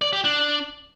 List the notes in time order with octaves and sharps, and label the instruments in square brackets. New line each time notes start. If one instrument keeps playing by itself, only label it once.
[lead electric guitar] D5
G4
D4